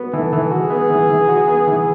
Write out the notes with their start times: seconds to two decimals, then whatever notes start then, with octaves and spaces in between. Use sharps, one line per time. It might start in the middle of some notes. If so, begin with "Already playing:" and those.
Already playing: B3 F#4
0.13 E3 A4
0.33 E3
0.51 F#4 G#4
0.70 B3
0.90 E3
1.09 E3
1.28 F#4
1.48 B3
1.67 E3